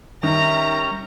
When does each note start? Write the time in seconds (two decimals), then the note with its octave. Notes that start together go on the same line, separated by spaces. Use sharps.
0.23 D#3 G3 C#4 E5 A#5